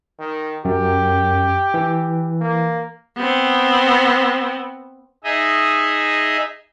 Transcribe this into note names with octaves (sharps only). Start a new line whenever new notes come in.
D#3
F#2 G4
E3
A#3
B3 C4
D#4 G#4 D#5 E5